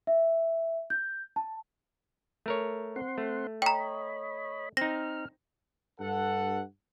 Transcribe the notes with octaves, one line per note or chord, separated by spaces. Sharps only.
E5
G6
A5
A3 A#4 C#5
C4 F#5 C6
A3
C#5 D#5 G5 A#5 B5
C4 D#4 F6 A#6
G2 A4 F#5